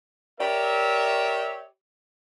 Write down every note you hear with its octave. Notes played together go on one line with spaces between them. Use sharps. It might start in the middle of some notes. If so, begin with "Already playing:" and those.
G4 A#4 C#5 D5 E5